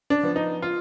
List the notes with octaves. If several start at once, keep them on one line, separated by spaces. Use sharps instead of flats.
D4
F3 B3
D#4
F4